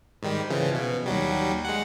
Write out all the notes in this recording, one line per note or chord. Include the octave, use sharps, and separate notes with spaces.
G#2 D#3 G3
C#3 E3 F3
B2
D#2 F#3 G3
G#3 F#5